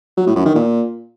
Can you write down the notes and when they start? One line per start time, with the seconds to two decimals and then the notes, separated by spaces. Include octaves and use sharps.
0.17 F#3
0.27 A2
0.36 F#2
0.46 D#3
0.55 A#2